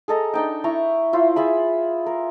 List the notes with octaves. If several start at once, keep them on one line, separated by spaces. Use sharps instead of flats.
G#4 A4 D#5 A#5
D4 D#4 G5
E4 A#5 C#6
E4 F4 C5
F4 G#4 E5 B5
A#4